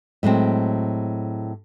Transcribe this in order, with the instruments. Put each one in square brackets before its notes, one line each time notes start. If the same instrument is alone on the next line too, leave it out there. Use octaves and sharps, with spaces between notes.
[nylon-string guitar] A2 F#3 G#3 C4